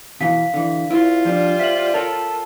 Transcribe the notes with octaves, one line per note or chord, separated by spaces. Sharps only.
B2 E3 F5 B6
D3 E3
C2 E4 F4
F3 G3 D4
C5 E5 B6 F#7
A4 A#4 C#5 G5